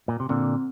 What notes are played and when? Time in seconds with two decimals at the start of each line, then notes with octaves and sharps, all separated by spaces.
0.08 A#2
0.20 C3
0.29 A#2 D3 C4